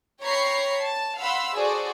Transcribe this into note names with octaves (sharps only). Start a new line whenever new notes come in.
C#5 G5 A#5 B5 C#6 C7
A5
F5 F#5 B5 C6 E6
F#4 G#4 A4 C5 D5